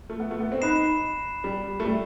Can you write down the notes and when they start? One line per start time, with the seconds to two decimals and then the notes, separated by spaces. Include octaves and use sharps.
0.10 A3
0.20 B3
0.31 A3
0.40 B3
0.52 C4
0.61 D#4 B5 F#6 C7 E7
1.44 G3
1.80 A3
1.85 G3